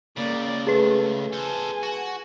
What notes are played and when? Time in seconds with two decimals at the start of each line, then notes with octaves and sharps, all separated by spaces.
0.18 C#2 C#3 A#3 D5
0.67 A3 G#4 B4
1.33 A4 C5 G#5
1.83 F#4